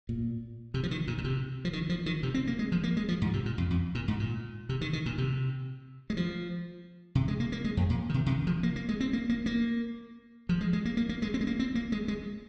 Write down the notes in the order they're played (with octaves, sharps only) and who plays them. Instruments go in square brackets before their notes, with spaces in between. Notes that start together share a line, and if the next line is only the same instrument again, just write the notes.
[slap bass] A#2
C3
F3
D#3
A#2
A#2
C3
F3
D#3
F3
D#3
C3
C4
A#3
G#3
F3
A#3
G#3
F3
G#2
C3
A#2
F2
F2
A#2
G#2
A#2
C3
D#3
D#3
A#2
C3
G#3
F3
C3
G#3
A#3
A#3
G#3
F2
A#2
D#3
C3
C3
D#3
F3
A#3
A#3
G#3
C4
A#3
A#3
A#3
F3
G#3
G#3
A#3
A#3
A#3
G#3
C4
G#3
A#3
C4
A#3
G#3
G#3